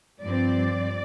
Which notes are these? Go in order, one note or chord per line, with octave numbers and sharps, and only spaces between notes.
G2 F3 C4 D5